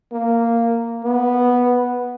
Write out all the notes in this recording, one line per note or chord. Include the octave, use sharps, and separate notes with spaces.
A#3
B3